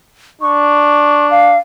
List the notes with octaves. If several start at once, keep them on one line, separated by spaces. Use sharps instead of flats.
D4 C#6
F5